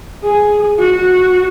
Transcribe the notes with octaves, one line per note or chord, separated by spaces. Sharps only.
G#4
F#4